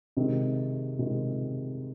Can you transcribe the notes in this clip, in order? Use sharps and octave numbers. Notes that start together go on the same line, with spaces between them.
C3 D#3 G#3 C4
C3 D#3 G#3 C4